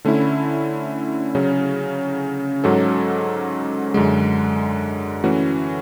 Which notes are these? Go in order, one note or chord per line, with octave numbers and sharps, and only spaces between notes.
D3 A3 C#4 E4
C#3 F#3 C#4
G#2 F#3 C#4 F#4 A4
F#2 D3 G#3
E3 A3 C#4 F#4